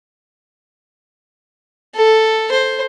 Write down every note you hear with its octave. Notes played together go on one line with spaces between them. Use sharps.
A4
C5